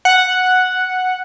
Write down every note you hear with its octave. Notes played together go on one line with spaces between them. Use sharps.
F#5